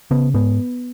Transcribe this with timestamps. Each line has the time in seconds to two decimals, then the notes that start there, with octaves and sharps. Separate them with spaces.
0.11 C#3 B3
0.34 G#2 B3